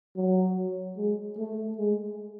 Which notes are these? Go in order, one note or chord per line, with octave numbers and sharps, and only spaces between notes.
F#3
G#3
A3
G#3